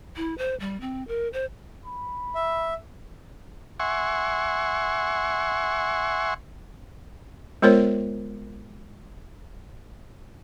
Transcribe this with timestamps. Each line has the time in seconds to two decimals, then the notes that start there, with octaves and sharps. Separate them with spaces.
0.17 E4
0.38 C5
0.60 G3
0.81 C4
1.08 A#4
1.33 C5
1.85 B5
2.35 E5
3.80 E5 F#5 G#5 C6 C#6
7.62 G#3 B3 F4 A#4 C5 C#5